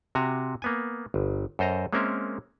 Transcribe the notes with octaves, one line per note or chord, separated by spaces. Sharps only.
C3 F#4 G#5 A#5
A#3 B3 G#5
G1
F#2 A4 C5 D#5 A#5
G#3 A#3 C4 C#4 A#4 E5